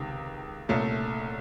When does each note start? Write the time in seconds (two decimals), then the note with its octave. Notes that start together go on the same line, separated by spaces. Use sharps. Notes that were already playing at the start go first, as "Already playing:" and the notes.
Already playing: C#2 C3 D#3
0.69 C2 A#2 A3 C#4